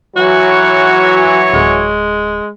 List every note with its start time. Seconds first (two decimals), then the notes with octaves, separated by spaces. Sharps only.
0.17 E3 F#3 F#4 C#5
1.54 D1 G#3